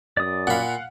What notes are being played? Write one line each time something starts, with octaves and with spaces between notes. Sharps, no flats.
F#2 D5 D#6
A#2 F5 F#5 B5